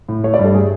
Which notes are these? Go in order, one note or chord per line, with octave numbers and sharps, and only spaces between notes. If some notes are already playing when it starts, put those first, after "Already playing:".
A2
A3 C#5
D5
G2
A4
A3 G#4